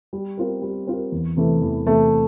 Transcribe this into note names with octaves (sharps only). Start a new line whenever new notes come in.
G3
C4 F4 A#4
G3
C4 F4 A#4
E2
C3 E3 A3
E2
C3 E3 A3